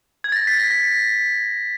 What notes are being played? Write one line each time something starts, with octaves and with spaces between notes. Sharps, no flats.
G#6
A6
A#6
B6
A#6
A#6